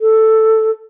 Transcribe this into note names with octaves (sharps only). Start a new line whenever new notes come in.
A4